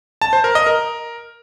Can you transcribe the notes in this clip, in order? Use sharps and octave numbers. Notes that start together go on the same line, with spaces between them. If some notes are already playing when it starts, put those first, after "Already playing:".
A5
C5
A#4
D#5
A#4